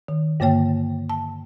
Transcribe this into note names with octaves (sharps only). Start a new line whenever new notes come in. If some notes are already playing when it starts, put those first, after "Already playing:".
D#3
G2 D3 A#3 C#5 G5
A5